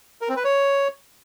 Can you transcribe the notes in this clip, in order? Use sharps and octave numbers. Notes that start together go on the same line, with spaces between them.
A#4
C4
B4
C#5